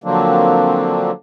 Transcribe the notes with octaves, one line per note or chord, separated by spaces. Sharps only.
D3 F3 F#3 A#3 C4 D4